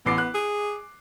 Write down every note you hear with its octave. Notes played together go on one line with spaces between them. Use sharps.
A1 B3 D6 C7
F#6
G#4